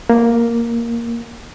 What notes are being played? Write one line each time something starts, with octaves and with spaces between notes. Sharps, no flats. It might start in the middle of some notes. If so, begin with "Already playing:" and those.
A#3